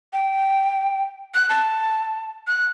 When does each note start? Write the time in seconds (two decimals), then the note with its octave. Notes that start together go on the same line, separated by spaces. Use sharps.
0.13 G5
1.34 F#6
1.49 A5
2.47 F#6